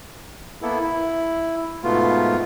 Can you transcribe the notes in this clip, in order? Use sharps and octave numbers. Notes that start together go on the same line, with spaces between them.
A#3 B3 E4 A4
E4
G#2 B2 A3 B3 F4